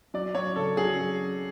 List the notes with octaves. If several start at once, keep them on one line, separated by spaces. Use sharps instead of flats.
F#3 D5
F#3 C#5
C#3 A4
F#3 G#4